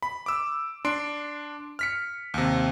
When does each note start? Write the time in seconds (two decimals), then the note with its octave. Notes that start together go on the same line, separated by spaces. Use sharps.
0.03 B5
0.26 D6 E6
0.85 D4 C6 D7
1.79 F6 B6 C#7
2.34 D#2 C3